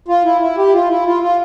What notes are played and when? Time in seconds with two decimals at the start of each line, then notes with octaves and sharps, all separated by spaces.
0.08 F4
0.25 E4
0.41 E4
0.57 G4
0.66 E4
0.73 F4
0.89 E4
1.07 F4
1.23 F4